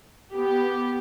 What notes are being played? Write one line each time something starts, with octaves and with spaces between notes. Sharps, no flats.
B3 G4